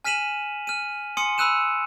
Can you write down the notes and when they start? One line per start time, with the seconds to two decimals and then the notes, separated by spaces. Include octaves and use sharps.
0.05 G#5 F6 B6 D#7 E7 F#7
0.67 F6 D#7
1.17 G#5 C6 D#6 C#7
1.38 B5 D#6 E6 F#6 D#7 E7